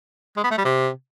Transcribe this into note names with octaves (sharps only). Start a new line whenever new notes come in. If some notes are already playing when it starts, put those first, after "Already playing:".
G#3
B3
A3
G3
C3